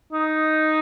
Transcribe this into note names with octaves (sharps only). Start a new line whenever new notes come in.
D#4